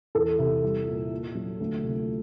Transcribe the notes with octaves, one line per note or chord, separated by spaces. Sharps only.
E2 A4
C3
C2
A#2
A#2
F#3
D2
C3